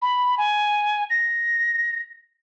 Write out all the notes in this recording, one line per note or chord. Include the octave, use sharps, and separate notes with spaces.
B5
G#5
A#6